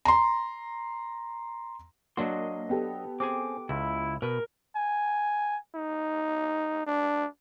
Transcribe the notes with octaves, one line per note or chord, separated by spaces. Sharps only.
A#5 C6
F#3 A#3 D4 F#4 D#5 C6
B3 G4 A4
C4 G#4 G#5 D6
C#2 E4
B2 A#4 B4
G#5
D#4
D4